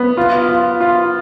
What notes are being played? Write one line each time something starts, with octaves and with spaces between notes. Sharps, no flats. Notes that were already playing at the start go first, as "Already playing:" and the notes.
Already playing: B3
F4
F4
F4